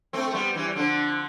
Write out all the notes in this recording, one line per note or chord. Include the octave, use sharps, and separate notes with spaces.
A3 C4
A3
G3 B3
E3 G3
G3
D3 F3